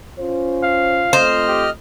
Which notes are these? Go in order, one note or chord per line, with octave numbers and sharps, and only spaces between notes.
C#4 F4 C5
F5
A3 C4 F4 C5 D#5 F6
G4